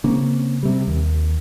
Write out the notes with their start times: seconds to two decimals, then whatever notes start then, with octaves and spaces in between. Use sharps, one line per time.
0.04 C#3 A#3 C4 C#4
0.63 C3 G3
0.87 D#2